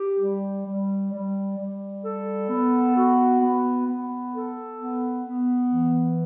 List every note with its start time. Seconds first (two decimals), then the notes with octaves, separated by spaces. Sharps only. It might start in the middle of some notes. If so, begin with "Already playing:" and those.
Already playing: G4
0.19 G3
0.65 G3
1.12 G3
1.58 G3
2.03 A4
2.49 B3
2.95 F#4
3.41 B3
3.87 B3
4.33 A4
4.79 B3
5.24 B3
5.70 E3